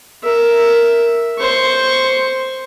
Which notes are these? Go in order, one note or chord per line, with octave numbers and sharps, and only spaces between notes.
A#4 E5
C5 C#6